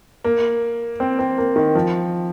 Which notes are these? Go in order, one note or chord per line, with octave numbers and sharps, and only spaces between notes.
A#3
C4
C4
A#3
D#3
F3